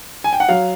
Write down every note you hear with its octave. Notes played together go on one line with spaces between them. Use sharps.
G#5
G5
F#5
F#3 F5